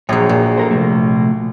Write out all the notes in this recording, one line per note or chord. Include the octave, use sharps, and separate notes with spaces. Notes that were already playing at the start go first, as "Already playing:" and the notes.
A#1 F#3 G#4 C#5
A#2
A4 A#4 C5
C3 F3 A3